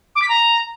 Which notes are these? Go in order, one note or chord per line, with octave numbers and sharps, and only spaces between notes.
D6
B6
A#5